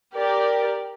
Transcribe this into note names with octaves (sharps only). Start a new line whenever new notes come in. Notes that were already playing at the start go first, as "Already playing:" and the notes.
G4 A#4 D5